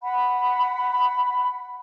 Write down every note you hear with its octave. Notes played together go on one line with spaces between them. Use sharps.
F#5 B5